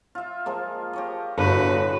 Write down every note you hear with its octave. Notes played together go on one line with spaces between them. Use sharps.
F4 E5
F3 G#3 A#3
G4 C#5 D#5
G1 A2 F#4 B4 D5